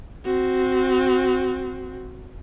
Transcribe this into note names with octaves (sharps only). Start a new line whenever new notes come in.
C4 F#4